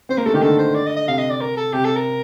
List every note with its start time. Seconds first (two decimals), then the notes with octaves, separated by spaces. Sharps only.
0.09 C4 C5
0.17 A#3 A#4
0.26 A3 A4
0.34 D#3 G4
0.42 D3 A4
0.59 C5
0.75 D5
0.86 D#5
0.96 D#5
1.08 C3 F5
1.18 D#5
1.30 D5
1.41 A#4
1.57 A4
1.73 C3 G4
1.85 A4
1.96 A#4